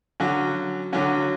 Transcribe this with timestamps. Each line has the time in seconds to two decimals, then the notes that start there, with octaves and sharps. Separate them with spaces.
0.20 D3 F#3 C#4 F#4
0.93 D3 F#3 C#4 F#4